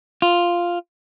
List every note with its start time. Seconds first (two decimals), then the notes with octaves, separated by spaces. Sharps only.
0.22 F4